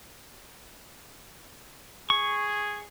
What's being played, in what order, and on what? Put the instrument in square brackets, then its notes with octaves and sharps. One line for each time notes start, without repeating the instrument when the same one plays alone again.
[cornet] G#4 [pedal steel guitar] C#6